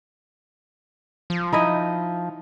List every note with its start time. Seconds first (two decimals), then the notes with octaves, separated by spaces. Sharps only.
1.30 F3
1.53 D#4 E4 D#5